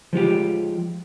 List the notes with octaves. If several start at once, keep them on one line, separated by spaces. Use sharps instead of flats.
F3 G#3 F4 G4